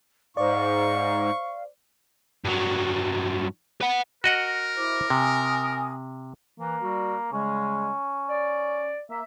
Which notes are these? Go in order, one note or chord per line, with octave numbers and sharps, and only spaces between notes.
G#2 C5 D5 F5 C#6
G2 F#3
B4 F#5
F#4 A#4 D#5 F#5
E4 C5 D6
C3 G#5 D#6
E3 A#3
G3 F#4
C#3 G3 G#3 C#4
D5
A#3 E5